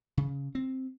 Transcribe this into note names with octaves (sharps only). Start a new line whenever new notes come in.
C#3
C4